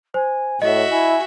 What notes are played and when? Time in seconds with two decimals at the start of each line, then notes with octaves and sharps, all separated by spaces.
0.14 C5 G#5
0.62 A2 F#4 C#5 D#5 E5
0.90 E4 G#5